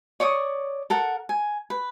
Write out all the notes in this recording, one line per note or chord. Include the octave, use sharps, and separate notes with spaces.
C#5 D5 C#6 D#6
A4 A#4 F#5
G#5
B4